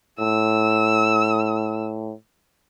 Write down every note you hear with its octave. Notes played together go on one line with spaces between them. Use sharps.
A2 E6